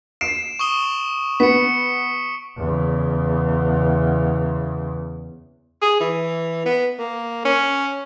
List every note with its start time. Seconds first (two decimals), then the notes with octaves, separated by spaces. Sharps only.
0.21 C7 D7 E7
0.59 C#6 D#6 G7
1.40 B3 B6 C#7
2.58 E2 C#3
5.82 G#4
6.00 E3
6.66 B3
6.98 A#3
7.45 C#4